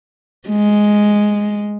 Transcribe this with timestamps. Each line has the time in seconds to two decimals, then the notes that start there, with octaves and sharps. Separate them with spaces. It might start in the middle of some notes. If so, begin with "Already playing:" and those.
0.49 G#3